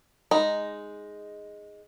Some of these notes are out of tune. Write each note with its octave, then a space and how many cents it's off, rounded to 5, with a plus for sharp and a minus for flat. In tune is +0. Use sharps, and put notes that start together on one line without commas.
G#3 +0 D#4 +0 B5 +0